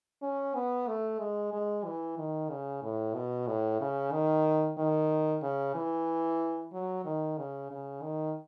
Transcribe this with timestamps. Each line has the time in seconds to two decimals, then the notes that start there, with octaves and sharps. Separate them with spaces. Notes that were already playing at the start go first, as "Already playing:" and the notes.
0.23 C#4
0.55 B3
0.87 A3
1.20 G#3
1.53 G#3
1.85 E3
2.18 D#3
2.50 C#3
2.83 A2
3.14 B2
3.47 A2
3.80 C#3
4.12 D#3
4.78 D#3
5.43 C#3
5.75 E3
6.73 F#3
7.05 D#3
7.38 C#3
7.71 C#3
8.02 D#3